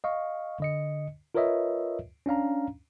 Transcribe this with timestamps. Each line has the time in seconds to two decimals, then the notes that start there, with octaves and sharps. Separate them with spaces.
0.04 D#5 F5 C#6
0.60 D3 D#5 C#7
1.35 F4 A#4 B4 C#5 D#5 E5
2.26 C#4 D4 F5 A#5